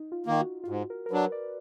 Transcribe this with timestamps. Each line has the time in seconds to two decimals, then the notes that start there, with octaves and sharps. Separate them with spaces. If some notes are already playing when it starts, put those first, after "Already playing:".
Already playing: D#4
0.12 F4
0.26 D#3 A#3
0.41 F#4
0.64 F4
0.68 G#2 F#4
0.90 A#4
1.06 A#4
1.11 F#3 D4 B4
1.32 D5